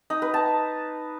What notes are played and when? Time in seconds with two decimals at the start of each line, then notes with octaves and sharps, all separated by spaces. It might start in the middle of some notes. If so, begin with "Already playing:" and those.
0.10 D#4
0.22 B4
0.34 A5